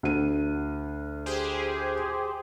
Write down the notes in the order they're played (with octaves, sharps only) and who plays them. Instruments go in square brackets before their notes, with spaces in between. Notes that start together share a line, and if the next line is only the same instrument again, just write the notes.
[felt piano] D2 D#7
[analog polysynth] G4 G#4 C5